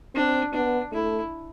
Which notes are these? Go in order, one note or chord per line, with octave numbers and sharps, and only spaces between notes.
C4 D4
B3 D4
A3 E4